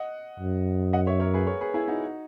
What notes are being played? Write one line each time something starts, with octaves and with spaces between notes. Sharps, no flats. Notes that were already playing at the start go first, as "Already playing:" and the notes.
Already playing: D#5 F#5
F#2
D#5 F#5
C#5 E5
A#4 C#5
G#4 B4
A#4 C#5
G#4 B4
E4 G#4
D#4 F#4